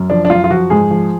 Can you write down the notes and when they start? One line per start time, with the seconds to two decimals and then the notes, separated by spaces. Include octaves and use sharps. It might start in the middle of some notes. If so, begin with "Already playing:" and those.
Already playing: F#2
0.10 F3 D4
0.25 D4
0.30 F#2 F4
0.44 F4
0.50 F3 F#4
0.70 G#2 G#4
0.91 F3